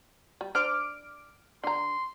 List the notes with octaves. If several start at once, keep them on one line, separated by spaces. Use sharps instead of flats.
G3
D4 C5 D6 F6 D7
D3 A#5 C6